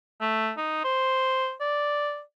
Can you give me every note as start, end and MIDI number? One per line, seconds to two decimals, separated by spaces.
0.21 0.52 57
0.57 0.83 63
0.84 1.52 72
1.61 2.21 74